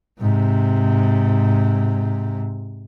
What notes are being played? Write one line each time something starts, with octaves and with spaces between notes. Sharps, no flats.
G#2 C3